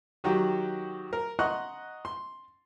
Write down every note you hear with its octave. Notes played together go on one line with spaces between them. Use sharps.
D#3 F#3 F#4 G4
A#4
D#5 F#5 A#5 C6 C#6 F#6
C6